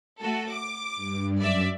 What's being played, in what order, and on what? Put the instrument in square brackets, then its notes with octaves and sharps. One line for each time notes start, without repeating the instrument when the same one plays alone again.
[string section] A3 F#4 A4
D6
[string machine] G2
[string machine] F#2 [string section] D5 E5